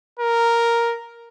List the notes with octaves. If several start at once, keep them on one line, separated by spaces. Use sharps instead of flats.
A#4